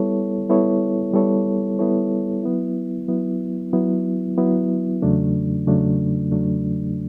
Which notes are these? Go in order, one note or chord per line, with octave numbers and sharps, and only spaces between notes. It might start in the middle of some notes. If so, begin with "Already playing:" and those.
Already playing: G3 B3 E4 A4 C#5
G3 B3 E4 A4 C#5
G3 B3 E4 A4 C#5
G3 B3 E4 A4 C#5
F#3 B3 E4
F#3 B3 E4
F#3 B3 E4
F#3 B3 E4
E2 C#3 F#3 A3 D4
E2 C#3 F#3 A3 D4
E2 C#3 F#3 A3 D4